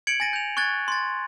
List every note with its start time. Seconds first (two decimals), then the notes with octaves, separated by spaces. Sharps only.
0.07 G#6 C#7 D7 F#7
0.20 G#5 A6 A#6 D#7
0.33 G6 F7
0.57 C#6 F#6 G#6 A6
0.88 C6 A6